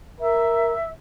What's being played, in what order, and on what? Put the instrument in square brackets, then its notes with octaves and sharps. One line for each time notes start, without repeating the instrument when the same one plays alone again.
[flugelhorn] A#4 [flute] E5